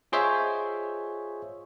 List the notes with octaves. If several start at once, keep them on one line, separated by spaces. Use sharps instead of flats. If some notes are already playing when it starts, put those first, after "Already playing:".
F4 G#4 C5 C#5 D#5 E5